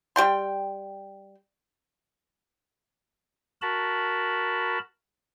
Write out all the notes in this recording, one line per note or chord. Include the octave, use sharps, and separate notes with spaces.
G3 G5 C6
F#4 A#4 A5 B5